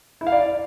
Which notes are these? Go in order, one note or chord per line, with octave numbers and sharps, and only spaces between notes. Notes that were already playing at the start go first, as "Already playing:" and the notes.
E4
F5
D5